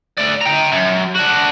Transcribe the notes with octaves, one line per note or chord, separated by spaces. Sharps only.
A3 D5
G5 A#5
F#2
D4 F#4